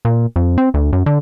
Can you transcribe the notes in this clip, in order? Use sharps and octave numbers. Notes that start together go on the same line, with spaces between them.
A#2
F2
C4
D2
F#2
D3